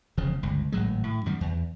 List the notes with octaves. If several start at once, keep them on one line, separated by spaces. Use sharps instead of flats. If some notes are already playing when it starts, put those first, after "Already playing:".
E1 C#3 F3
G1 C#2
G#1 A2 F#3 G#3
A2
F#2 D#3 G3
E2